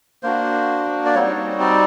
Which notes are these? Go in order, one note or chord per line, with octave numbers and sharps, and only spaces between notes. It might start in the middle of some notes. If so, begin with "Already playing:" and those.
A#3 D4 F#4 C5
D5
G3 C4 D#4 F#4 C#5
D5